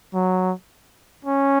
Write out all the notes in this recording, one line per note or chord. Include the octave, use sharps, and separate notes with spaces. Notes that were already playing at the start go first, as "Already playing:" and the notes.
F#3
C#4